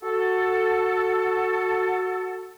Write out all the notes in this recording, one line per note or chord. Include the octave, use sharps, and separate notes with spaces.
F#4 A4